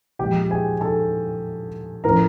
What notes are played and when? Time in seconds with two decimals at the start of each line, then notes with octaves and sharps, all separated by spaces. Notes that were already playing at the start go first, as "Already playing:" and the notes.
0.19 A#2 F3 G#3 G4 G5
0.50 G#4 G#5
0.81 A4 A5
2.04 A2 F3 A3 C#4 A#4 A#5